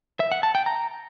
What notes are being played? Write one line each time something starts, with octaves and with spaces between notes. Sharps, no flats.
E5
F#5
A5
G5
A#5